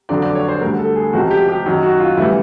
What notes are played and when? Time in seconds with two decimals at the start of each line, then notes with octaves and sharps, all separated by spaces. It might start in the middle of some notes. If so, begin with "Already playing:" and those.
0.09 F2 D3 F#3 D5
0.22 D5
0.35 C#5
0.48 C5
0.61 D2 D3 G3 A#4
0.79 A4
0.96 G#4
1.13 C#2 C3 F3 G#3 F#4
1.31 G4
1.48 G4
1.66 F#2 D#3 F#3
1.83 F#4
2.00 F4
2.17 D2 C#3 E3 G3 E4